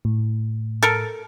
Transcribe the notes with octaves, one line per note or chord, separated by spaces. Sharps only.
A2
A4 A#4